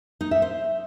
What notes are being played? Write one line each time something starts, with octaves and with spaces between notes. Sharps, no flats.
D#4
E5
C5